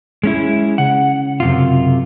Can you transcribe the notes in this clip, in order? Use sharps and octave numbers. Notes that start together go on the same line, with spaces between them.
G#3 C#4 E4
C#3 F#5
F#2 C3 F4